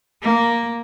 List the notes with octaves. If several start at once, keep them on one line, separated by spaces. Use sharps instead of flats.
A#3